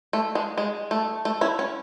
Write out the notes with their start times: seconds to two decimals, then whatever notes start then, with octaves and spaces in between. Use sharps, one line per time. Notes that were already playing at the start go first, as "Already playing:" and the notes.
0.13 A3
0.35 G#3
0.58 G#3
0.91 A3
1.25 A3
1.41 C#4 E4
1.59 C#4